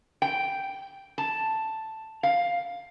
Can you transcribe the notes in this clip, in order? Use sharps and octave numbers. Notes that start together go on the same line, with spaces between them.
G5
A5
F5